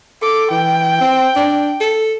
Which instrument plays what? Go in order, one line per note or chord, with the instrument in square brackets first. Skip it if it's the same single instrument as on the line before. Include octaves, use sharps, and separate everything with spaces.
[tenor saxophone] A4 [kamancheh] D6
[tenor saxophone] E3 [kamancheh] G5
[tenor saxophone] C4
D4
A4